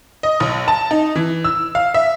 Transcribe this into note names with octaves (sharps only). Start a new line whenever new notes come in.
D#5
B1
A5
D#4
E3
E6
F5
E5